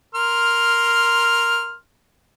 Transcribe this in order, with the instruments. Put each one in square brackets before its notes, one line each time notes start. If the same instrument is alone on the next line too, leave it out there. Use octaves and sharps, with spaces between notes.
[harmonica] A#4 C6 F6